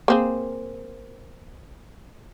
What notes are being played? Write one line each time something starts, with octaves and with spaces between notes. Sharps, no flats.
A#3 C4 G#4